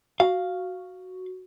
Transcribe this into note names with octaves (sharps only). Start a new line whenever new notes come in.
F#4 F5